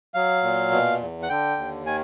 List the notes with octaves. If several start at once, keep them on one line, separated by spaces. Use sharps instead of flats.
F#3 F5
A#2
B2
E2
F#5
D3 G5
D#2
D#3 G#5